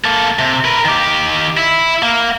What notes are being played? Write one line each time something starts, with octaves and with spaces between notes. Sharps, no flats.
A#3 A4
C3
A#4 B4
D#3 G4
E4
A#3